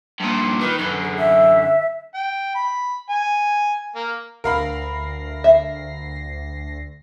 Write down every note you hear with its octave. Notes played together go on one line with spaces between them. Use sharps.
G2 A#2
D#3 B4
F#2 D3 B4
G#4
E5
G5
B5
G#5
A#3
D2 A#4 F5 B5 A#6 C7
E5